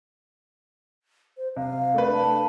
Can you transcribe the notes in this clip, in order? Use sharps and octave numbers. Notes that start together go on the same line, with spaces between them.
C5
C3 F5
A3 D4 B4
A5